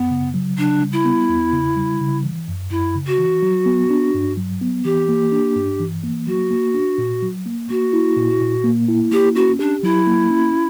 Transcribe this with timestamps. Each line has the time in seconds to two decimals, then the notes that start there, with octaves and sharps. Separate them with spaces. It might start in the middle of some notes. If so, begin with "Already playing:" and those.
Already playing: F#2 B3
0.11 C#3
0.34 F#3
0.57 C#3 D4
0.81 G3
0.93 E4
1.05 B3
1.29 E2
1.53 C#3
1.76 G3
2.00 C#3
2.24 E3
2.48 F#2
2.71 F#2 E4
2.95 C#3
3.07 F#4
3.18 E3
3.42 F#3
3.66 B3
3.90 D4
4.14 G2
4.37 F#3
4.61 B3
4.85 E3 G4
5.09 A#3
5.32 D4
5.55 G2
5.80 E3
6.03 A#3
6.27 F#3 F#4
6.51 A#3
6.74 D4
6.98 A#2
7.22 F#3
7.46 A#3
7.70 A#3 F#4
7.93 E4
8.17 A#2
8.41 A#2
8.64 A#3
8.88 E4
9.11 A#3 G4
9.36 C#4 F#4
9.59 D4 G4
9.83 F#3 E4
10.07 A#3
10.30 C#4